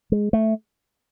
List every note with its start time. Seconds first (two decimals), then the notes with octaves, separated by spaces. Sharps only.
0.12 G#3
0.33 A3